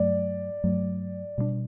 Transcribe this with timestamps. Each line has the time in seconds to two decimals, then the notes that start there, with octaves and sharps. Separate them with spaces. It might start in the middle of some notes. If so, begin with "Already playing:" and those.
Already playing: G2 F#3 A3 D5
0.64 G2 F#3 A3
1.38 B2 G3 B3 D4